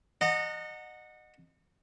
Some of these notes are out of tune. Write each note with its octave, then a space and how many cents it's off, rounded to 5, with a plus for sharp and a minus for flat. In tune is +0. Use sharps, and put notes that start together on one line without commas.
D#5 -20 F#5 -15 A#5 -45